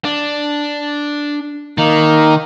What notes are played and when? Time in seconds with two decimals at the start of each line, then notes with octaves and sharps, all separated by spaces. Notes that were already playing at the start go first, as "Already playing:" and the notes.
0.05 D4
1.78 D#3 A#3 D#4